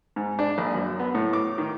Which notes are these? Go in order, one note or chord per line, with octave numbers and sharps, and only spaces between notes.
G#2
D4
A#1
F#2
B3
A2
D6
D#3